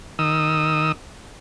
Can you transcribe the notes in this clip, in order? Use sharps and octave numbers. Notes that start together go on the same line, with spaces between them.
D#3 D#6 E6